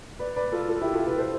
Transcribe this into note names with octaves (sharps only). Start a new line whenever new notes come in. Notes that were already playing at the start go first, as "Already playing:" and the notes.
B4 D5
B4 D5
F4 A4
F4 A4
E4 G4
F4 A4
G4 B4
A4 C5